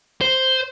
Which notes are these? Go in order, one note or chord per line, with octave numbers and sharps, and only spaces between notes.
C5